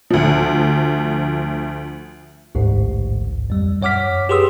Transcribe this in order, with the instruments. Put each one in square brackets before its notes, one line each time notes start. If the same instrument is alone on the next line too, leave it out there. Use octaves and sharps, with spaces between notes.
[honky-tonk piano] D2 F3
[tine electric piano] A1 D2 G#2
F2 G3
F#2 C#5 F#5 D6 F6 B6
G4 G#4 B4 C6 D#6 E6